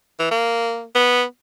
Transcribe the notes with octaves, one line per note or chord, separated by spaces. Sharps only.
E3
A#3
B3